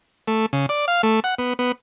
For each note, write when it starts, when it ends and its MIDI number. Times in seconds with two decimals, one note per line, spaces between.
0.28 0.46 57
0.53 0.66 49
0.69 0.86 74
0.88 1.02 77
1.03 1.20 57
1.24 1.35 78
1.39 1.53 59
1.59 1.72 59